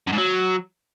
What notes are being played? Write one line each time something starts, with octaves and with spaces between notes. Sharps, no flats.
F#2
G#2
F#3